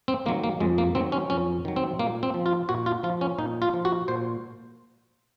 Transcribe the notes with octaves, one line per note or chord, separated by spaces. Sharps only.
C4
D#3 F#3 A#3
A#3
F2 G#3
A#3
D#3 F#3 C4
C#4
F2 C#4
D#3 F#3
C4
A#2 A#3
C4
F3
F4
A#2 F#4
F4
F3 F4
C#4
A#2 D#4
F4
F3
F#4
A#2 C5